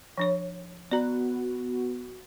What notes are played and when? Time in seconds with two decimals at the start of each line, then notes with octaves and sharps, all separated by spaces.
0.18 F3 D4 C#5
0.91 B3 F#4 D5 A#5